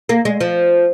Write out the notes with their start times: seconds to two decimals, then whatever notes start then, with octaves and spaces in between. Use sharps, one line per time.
0.09 A#3
0.25 G#3
0.40 F3